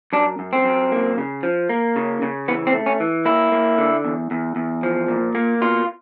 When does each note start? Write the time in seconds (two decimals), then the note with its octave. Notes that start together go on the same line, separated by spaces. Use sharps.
0.13 F#2 D4
0.39 F#2
0.53 C4
0.65 F#2
0.92 A#3
1.18 C#3
1.43 F3
1.69 A#3
1.96 C#3
2.22 C#3
2.48 E3 B3
2.67 C4
2.74 A3
2.86 C#4
3.00 E3
3.25 A#3 E4
3.52 A#3
3.78 D3
4.05 E2
4.31 E2
4.56 E2
4.83 F3
5.08 A#2
5.35 A#3
5.61 B2 F4